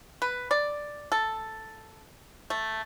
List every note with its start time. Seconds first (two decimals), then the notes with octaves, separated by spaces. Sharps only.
0.22 B4
0.51 D5
1.12 A4
2.50 A3